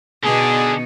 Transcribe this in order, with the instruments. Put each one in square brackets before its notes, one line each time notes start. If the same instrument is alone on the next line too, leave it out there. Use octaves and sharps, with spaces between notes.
[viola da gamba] B2 B3 D#4 [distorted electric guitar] D3 D4 [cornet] G#4